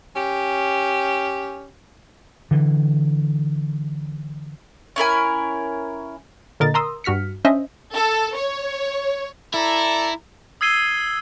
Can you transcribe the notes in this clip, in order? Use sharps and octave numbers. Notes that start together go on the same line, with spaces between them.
C#4 G4
D3 E3
C#4 E4 A#4 G#5
A#2 D3 A#4 D#5 A6
A#4 A#5 C6 D#6 E6
G2 F#4 F6 B6 C#7
C#4 D4 C5 D#5 E5
A4
C#5
E4 A4 D5 A#5
D#6 E6 G#6 C7 D#7 G7